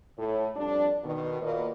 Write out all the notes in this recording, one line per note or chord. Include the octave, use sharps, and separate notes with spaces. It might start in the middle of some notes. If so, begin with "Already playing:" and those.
A2
F2 G3 D4
B2 D#3
A#2 A#3 F#4 B4 D#5